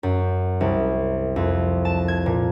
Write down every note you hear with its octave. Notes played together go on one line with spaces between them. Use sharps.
F#2
C2
F2
A5
G#6
A#2